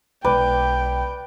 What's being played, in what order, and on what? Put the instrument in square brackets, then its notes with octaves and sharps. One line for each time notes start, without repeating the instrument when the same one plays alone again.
[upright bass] B1 G#3 [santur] B4 D5 [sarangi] G5